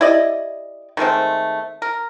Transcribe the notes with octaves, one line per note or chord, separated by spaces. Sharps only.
E4 G4 D5 D#5
D#3 G#3 A3 C4
A#4